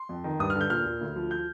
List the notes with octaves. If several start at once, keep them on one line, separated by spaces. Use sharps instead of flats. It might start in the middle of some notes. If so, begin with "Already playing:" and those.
Already playing: C6
F2
D#3
G2 D#6
F6
D3
G6
A#2 F6
A#2
D2
F3
G6